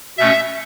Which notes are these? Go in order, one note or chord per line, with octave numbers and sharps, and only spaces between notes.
B2 A3 C#4 E5